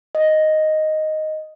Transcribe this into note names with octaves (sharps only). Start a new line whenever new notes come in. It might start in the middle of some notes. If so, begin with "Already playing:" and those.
D#5